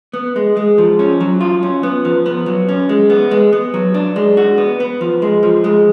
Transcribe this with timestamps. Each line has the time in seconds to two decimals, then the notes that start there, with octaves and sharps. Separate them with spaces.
0.13 B3
0.36 G#3
0.57 G#3
0.78 F3
0.99 C#4
1.20 F#3
1.41 F4
1.63 C#4
1.83 B3
2.05 F3
2.26 B3
2.46 F#3
2.69 C#4
2.89 G#3
3.10 B3
3.31 G#3
3.53 B3
3.74 F#3
3.94 D4
4.16 G#3
4.37 F#4
4.58 B3
4.80 B3
5.01 F3
5.22 G#3
5.43 F3
5.64 G#3